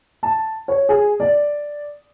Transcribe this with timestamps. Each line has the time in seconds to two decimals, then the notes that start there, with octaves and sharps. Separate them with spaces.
0.23 A5
0.68 C#5
0.89 G#4
1.20 D5